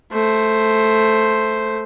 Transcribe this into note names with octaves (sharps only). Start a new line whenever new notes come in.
A3 C5